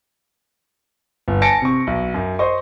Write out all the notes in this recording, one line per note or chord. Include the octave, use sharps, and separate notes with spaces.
G1
G#5 A5 A#6 C#7 D7
C3 C#6
B1
F#2
C5 D#5 C#6